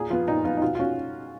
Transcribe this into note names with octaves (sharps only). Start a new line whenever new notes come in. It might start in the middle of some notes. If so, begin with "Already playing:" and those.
Already playing: A#2 G#4
F3 B3 F4
A#2 D#4
F3 B3 F4
D#4
B2 F4
F4
C#4 F#4